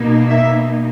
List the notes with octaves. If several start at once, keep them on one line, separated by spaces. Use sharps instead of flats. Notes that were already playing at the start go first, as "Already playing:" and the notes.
Already playing: B2 A#3 D#4
E5